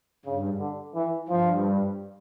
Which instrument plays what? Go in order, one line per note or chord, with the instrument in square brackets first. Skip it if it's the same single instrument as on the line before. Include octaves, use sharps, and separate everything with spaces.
[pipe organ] G2 [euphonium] C#3
[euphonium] D3
E3
[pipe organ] G2 [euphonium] F3